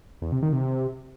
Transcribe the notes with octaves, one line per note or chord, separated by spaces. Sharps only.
E2
C3
D#3
C3